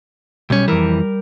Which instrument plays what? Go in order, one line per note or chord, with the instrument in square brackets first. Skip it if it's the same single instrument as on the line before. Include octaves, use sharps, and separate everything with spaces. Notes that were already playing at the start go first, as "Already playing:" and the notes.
[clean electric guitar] B1 C#4 [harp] G3
[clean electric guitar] F2 E3 [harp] A#4